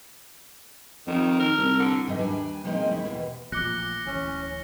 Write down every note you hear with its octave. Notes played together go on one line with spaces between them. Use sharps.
F2 D#3
D#3 A#4
C2
D3
G2 E3 F#3 D#4 D#5 E5
D#2 G3 D4 G#5
F3 G#3 A#3 C4 C#4 D#4
D#2 E4
D#2 B2 E3
A1 A#2 F3 D6 F#6 A#6 C#7 G7
D1 G1 E3 C#4